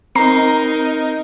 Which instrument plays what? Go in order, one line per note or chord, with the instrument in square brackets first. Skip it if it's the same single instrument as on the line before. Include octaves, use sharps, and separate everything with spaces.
[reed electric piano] C4 [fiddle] D#4 A#4 [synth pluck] A#5 C7